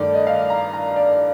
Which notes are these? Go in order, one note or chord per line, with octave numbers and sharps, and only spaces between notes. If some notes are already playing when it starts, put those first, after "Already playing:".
Already playing: G2 D#3 A3 D5
D#5
F5
A#5
A#5
D5